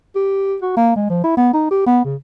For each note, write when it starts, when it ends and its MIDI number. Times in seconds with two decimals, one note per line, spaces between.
0.16 0.56 67
0.62 0.73 66
0.77 0.92 58
0.96 1.07 56
1.10 1.24 53
1.24 1.33 64
1.37 1.51 59
1.53 1.70 63
1.71 1.82 67
1.86 2.03 59
2.04 2.16 49